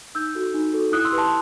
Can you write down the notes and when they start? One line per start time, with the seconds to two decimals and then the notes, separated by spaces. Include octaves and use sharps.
0.15 D#4 E6 G6
0.35 F#4 A4
0.54 D#4
0.73 F#4 A4
0.92 E4 D#6 F#6
1.05 C6 E6
1.11 G4 B4
1.18 A5 C6